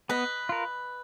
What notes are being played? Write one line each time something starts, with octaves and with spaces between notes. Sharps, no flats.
B3 B4 D#5
F4 A#4